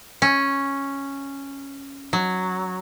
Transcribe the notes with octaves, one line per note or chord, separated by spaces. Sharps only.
C#4
F#3